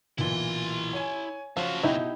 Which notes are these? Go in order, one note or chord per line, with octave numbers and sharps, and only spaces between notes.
B1 A#2 E3 E4 C6
C#5 G#5
C#3 F3 C#4 F#4 F5
B2 D#4 E4 G4